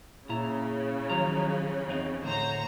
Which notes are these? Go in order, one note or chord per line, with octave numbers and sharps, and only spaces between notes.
A#2 C#3 E4 A#5
D#3 F3 F#3 A#5
E2 C4 D#4
D2 A2 C5 C#5 A#5